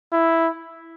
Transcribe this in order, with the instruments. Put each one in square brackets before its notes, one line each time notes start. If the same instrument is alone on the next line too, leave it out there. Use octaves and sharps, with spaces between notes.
[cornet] E4